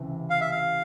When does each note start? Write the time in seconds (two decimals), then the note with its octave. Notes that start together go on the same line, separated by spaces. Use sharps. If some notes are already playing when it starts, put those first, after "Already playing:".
Already playing: C#2 C3 E3
0.30 F5
0.41 E5
0.51 F5